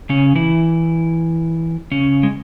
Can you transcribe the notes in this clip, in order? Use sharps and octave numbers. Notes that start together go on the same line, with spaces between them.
C#3 C#4
E3 E4
C#3 C#4
G#3